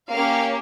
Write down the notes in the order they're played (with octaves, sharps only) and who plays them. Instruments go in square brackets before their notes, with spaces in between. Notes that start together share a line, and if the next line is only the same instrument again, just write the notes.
[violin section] A#3 C#4 G4 F5